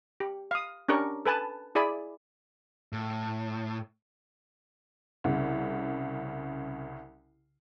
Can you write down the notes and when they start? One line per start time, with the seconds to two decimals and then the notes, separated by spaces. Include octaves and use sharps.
0.20 G4
0.51 F5 D#6
0.89 C#4 D4 G4 A#4 C#6
1.26 A4 B4 G#5 A5
1.75 E4 G#4 D5 G#5 B5
2.93 A2
5.24 C2 C#3